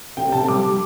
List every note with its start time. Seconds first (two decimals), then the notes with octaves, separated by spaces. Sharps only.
0.17 C3 G5
0.32 C3 A5
0.48 G3 D6
0.64 G3